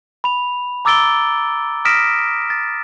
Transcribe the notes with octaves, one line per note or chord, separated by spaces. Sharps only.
B5 F7
A#5 D6 E6 A6 D7 G7
D#6 F6 A#6 B6 D7 E7
A6